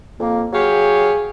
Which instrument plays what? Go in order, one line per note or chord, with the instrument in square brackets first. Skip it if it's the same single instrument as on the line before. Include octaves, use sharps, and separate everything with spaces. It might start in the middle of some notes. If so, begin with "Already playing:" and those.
[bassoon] F2 [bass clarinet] A#3
[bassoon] F#3 [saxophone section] G4 C#5 F5 [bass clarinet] G#4